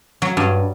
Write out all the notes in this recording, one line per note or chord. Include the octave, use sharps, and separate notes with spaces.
F#3
G2